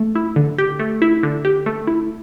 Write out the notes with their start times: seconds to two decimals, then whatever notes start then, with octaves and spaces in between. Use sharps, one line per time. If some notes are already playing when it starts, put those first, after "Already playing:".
Already playing: A3
0.15 E4
0.36 D3
0.58 G4
0.79 A3
1.02 E4
1.23 D3
1.45 G4
1.66 A3
1.87 E4